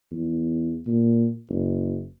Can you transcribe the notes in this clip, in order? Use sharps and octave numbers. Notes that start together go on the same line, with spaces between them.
E2
A#2
F#1